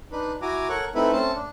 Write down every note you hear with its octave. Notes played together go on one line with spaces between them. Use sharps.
D4 D#4 B4
E4 F#4 G#5 A#5 D6
A4 A#4 C#5 F#5 C#6
A3 C4 D#4 E4 A4 B4
A3 C4 C#4 A4 C5 A5
D4